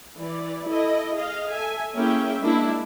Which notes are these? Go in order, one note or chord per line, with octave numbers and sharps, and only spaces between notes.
E3 D5
E4 A4 D#5
G#4 D#5 F5
A4 E5 G#5
A#3 C#4 E4 G#4 E5 G5
G#3 A#3 D4 E4